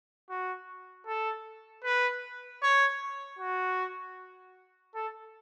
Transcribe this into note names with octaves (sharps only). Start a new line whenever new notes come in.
F#4
A4
B4
C#5
F#4
A4